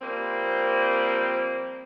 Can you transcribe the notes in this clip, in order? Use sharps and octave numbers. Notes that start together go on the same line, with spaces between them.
F3 G3 A#3 C4